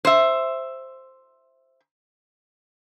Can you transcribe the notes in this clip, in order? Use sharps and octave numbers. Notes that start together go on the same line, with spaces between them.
C5 E5